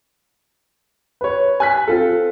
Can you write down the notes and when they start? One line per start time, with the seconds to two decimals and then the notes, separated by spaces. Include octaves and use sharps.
1.21 B4 C#5
1.60 G#5 F#6 B6
1.87 C4 F4 A4